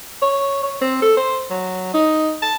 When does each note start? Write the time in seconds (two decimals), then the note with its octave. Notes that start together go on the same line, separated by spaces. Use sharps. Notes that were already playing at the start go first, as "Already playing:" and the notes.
0.22 C#5
0.63 C#5
0.81 C4
1.02 A4
1.17 C5
1.50 F#3
1.94 D#4
2.42 A5